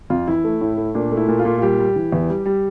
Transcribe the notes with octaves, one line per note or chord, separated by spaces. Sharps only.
F2 F4
E3 E4
A3
A2
A3
A#2 D4
A3
E4
A#2
F4
A#2
F4
G3 G4
G3
E3
E2
G3
G3